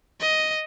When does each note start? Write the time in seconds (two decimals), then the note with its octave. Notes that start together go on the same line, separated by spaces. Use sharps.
0.21 D#5